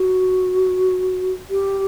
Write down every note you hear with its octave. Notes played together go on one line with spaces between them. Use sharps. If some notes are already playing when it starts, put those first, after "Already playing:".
Already playing: F#4
G4